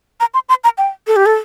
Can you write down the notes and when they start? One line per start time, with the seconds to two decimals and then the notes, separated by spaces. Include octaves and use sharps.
0.20 A#5
0.34 C6
0.49 C6
0.64 A#5
0.78 G5
1.07 A4
1.16 G4
1.26 A4